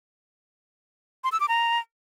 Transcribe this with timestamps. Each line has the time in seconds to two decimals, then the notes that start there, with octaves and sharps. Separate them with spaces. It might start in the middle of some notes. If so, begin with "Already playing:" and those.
1.24 C6
1.32 E6
1.40 D6
1.48 A#5